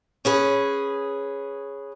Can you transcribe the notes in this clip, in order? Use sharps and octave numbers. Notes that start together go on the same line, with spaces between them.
C#4 G#4 B4